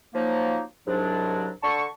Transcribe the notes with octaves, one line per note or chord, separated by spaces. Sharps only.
F3 F#3 A#3 D#4
C2 G#2 F#3 D4
D3 A5 C#6